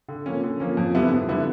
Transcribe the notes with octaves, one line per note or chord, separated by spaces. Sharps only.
D3
F3 A#3 C#4
D3
F3 A#3 C#4
F2
D3 G3 B3 E4
F2
D3 G3 B3 E4